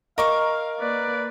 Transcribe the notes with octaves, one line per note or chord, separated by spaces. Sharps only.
A#4 D#5 F5 C#6 D6
A#3 B4 D5